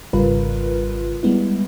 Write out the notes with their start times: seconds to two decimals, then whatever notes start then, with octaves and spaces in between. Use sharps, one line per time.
0.13 G#1 C#3 G3 F4 A#4 B4
1.23 G3 G#3 B3 E4